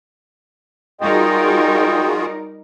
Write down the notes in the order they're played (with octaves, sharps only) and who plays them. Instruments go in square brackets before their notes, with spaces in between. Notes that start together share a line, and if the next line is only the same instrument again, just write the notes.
[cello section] G3 D#4 A#4 [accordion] F4 F#4 G#4 [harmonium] D#5 G5